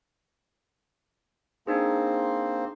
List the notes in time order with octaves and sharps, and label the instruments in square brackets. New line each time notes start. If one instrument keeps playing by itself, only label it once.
[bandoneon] A#3 C4 C5 [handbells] D4 D#4 G#4